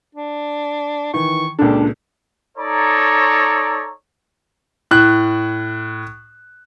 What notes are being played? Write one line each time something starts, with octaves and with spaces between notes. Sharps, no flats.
D4
D#3 E3 C#6
C#2 A#2 D4 G4 A4
D#4 A4 C#5 D5 A#5
A2 F#6